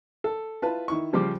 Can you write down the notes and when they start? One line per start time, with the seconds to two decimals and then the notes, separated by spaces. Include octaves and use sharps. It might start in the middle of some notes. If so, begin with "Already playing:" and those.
0.24 A4
0.62 E4 F4 B4 A5
0.88 D#3 E4 C#6
1.13 C#3 F3 G3 C5 D6